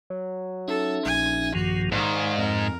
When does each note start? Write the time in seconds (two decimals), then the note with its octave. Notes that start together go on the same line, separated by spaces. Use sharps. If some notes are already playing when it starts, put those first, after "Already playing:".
0.10 F#3
0.68 C#4 D#4 A4 E5
1.06 A#1 G#5
1.55 G2 D#3 F3 F#4
1.92 G#2 D#3 D5 F5
2.38 F2 A#4